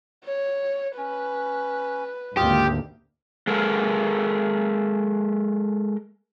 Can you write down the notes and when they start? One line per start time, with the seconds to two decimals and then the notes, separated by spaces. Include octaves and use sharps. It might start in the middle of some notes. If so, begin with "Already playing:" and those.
0.25 C#5
0.98 C#4 B4
2.37 G#1 D2 A#3 F4 G4 D#6
3.47 G#3 A4 A#4